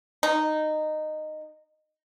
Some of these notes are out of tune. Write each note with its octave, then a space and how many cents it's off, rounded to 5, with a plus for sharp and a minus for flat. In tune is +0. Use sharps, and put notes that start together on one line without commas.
D#4 -15